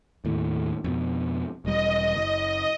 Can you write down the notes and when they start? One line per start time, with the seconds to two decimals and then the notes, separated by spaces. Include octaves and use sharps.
0.25 D#2 A2
0.84 F2 B2
1.65 E1 G3 D#5
2.16 F#1